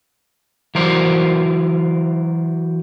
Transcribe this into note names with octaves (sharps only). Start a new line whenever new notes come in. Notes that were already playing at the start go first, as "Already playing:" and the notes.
E3 F#3 A#4 C5 D5